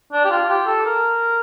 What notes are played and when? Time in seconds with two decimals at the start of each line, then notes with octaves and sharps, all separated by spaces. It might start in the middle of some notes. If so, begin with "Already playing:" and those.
0.12 D4
0.24 G4
0.30 F4
0.49 G4
0.66 A4
0.85 A#4